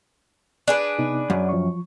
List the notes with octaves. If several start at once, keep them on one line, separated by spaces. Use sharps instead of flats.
D4 G#4 B4
C3 B3 D#4
F#2 F#5
F3 C#6